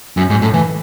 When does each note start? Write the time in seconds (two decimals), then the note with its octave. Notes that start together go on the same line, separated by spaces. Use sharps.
0.17 F#2
0.30 G#2
0.42 A2
0.53 E3